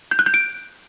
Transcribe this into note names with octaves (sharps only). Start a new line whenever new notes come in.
G6
F#6
G6
D7